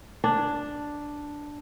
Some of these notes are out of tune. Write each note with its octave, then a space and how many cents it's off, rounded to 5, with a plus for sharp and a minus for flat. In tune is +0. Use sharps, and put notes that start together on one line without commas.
D4 +0